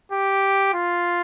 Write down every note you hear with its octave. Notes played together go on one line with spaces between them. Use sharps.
G4
F4